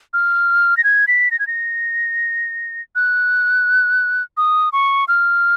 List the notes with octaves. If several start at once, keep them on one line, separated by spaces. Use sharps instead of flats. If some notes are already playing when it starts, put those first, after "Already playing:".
F6
A#6
G#6
B6
A#6
G#6
A#6
F#6
D#6
C#6
F6